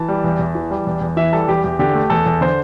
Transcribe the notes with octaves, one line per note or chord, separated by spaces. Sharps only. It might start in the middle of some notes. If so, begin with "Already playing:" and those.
Already playing: E3 A5
G3
E2
E2
E3
G3
E2
E2
E3 E5
G3 A4
E2 G4
E2 G4
D3 G4
A3
E2 A4
E2
D3 C5